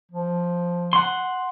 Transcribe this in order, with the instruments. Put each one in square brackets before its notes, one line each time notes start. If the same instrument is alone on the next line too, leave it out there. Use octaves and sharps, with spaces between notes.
[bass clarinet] F3
[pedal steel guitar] F#5 C6